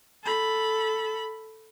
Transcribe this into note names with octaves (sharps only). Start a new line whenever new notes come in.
A4 B5